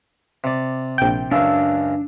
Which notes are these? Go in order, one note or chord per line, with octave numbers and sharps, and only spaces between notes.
C3 D5
A#1 G5
C#2 F#2 C#3 D4 E6